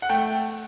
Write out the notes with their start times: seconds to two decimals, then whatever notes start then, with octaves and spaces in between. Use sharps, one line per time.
0.02 F#5
0.09 A3 G5